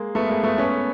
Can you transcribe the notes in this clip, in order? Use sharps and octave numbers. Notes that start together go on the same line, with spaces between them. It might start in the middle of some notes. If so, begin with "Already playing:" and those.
Already playing: G#3 A#3
A3 B3
G#3 A#3
A3 B3
B3 C#4